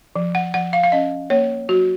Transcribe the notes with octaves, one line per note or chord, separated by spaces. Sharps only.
F3
F#5
F3 F#5
F5
F5
C#4 D#5
A#3 C#5
F#3 F#4